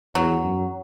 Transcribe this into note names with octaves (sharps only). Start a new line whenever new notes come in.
E2 F#3
F#2